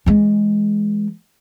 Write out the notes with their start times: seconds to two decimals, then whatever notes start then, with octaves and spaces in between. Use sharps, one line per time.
0.06 E3 G#3